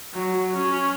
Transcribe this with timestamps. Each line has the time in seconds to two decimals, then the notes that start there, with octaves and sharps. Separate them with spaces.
0.13 F#3
0.56 C#4